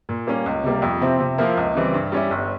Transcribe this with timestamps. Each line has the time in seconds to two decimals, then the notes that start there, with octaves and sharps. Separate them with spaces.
0.09 A#2
0.27 G3 A#3 C#4
0.46 C#2
0.63 C3 G3 A#3
0.82 F2
1.01 C3 F3 C4 E4
1.20 C3
1.38 F3 A#3 E4 A#4
1.57 C#2
1.75 C#3 E3 G3 C4
1.94 G2
2.12 G3 C#4 E4
2.30 G1